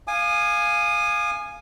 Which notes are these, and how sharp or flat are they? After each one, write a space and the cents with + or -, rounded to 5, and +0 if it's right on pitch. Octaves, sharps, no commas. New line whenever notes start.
F5 +0 G#5 +0 D#6 -40